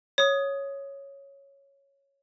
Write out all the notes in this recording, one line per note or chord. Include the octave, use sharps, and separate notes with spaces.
C#5 D#6